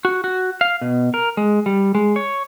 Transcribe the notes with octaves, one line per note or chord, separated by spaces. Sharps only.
F#4
F#4
F5
B2
A#4
G#3
G3
G#3
C#5